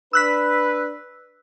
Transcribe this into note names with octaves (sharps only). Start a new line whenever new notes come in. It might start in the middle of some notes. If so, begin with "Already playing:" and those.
D4 B4 E6 F#6 B6